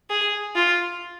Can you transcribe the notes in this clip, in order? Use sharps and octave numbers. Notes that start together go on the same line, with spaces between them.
G#4
F4